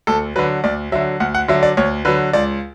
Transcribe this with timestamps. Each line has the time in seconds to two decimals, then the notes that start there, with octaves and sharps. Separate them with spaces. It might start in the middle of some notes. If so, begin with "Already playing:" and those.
0.07 D2 A4
0.36 D3 F#3 B4
0.64 D2 D5
0.92 D3 F#3 E5
1.20 D2 F#5
1.35 F#5
1.48 D3 F#3 E5
1.63 D5
1.77 D2 C#5
2.05 D3 F#3 B4
2.33 C#2 D5